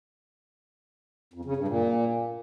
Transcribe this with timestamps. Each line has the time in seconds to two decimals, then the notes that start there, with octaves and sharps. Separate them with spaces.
1.34 F2
1.45 C#3
1.56 G2
1.68 A#2